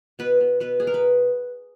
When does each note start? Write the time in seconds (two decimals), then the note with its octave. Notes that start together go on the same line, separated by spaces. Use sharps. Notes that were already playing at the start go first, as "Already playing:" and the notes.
0.19 B2 B4
0.40 B2
0.60 B2 B4
0.80 B2 G#4
0.87 A#4
0.94 B4